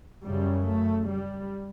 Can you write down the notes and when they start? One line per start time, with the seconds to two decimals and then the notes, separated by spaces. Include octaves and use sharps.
0.24 F#2 C#3 G3
0.65 A3
1.07 G3